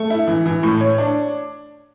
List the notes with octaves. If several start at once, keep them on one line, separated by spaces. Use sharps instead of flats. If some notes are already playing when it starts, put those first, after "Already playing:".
Already playing: A3
E4
E3
E3
A2
C#5
D4